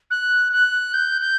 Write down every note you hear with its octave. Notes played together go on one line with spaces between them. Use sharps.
F#6
F#6
G6
G6